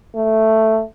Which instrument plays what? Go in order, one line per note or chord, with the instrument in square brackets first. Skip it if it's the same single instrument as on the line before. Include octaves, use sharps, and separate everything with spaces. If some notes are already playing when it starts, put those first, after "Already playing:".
[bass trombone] A3